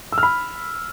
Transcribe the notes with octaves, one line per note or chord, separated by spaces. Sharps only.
E6
F6
B5